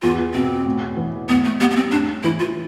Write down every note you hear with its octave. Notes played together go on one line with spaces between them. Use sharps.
E2 F4
B2 C4
A2
E3
A2 B3
A3
G3 B3
B3
C4
A2 D4
E3 E4
F4